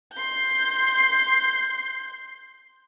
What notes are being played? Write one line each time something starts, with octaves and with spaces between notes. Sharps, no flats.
C6 G6